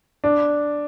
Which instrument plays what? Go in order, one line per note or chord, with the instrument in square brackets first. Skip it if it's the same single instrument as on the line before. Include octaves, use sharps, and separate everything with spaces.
[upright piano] D4